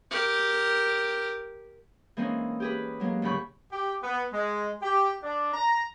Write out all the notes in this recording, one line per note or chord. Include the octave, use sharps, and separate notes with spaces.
G4 A#4
E3 G#3 A#3 C4 C#4 D#4
G4 G#4 B4
F#3 G#3 A#3
D2 G#2 C#3 G4 B5 C#6
G4
B3
G#3
G4
D4
A#5